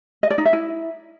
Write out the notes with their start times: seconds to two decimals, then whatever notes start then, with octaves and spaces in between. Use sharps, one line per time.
0.23 D#5
0.30 D5
0.38 D#4
0.45 E5
0.53 E4